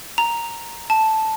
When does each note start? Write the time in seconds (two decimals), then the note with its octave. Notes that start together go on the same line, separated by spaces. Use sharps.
0.18 A#5
0.90 A5